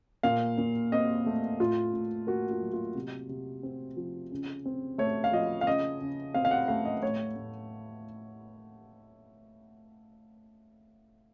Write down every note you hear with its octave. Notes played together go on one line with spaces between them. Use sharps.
A#2 F5
A#2
C4 D#5
A3
A2 F4
A2
A#3 F#4
F4
F#3
F4
C3
C3
C4
F3
C#3
C4
A3 C#5
F5
F3 D#5
F5
C#3 D#5
C#3
C4 F5
F5
F#5
A3 F5
D#5
A2 C#5
A2